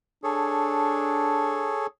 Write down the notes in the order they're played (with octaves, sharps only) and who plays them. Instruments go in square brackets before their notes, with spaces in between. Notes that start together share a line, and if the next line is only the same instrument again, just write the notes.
[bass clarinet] D4 [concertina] G#4 A4 C#5